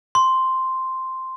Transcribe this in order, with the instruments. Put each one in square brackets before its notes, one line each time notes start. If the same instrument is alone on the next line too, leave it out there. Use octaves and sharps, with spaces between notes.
[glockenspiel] C6